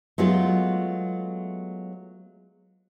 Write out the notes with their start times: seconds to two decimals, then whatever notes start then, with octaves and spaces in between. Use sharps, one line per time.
0.18 F#3 G#3 A3 B3 F4